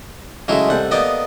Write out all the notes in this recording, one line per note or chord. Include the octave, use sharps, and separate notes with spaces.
C#3 F#3 G#3 A3 E4 D#5
C2 G3 G4 A4 F#5
A#3 B3 A4 A#4 D5 D#5